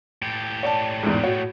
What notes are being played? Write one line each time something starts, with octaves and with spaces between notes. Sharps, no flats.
A2 G4
C#5 D5 A5
E2 G#2
F#4 C#5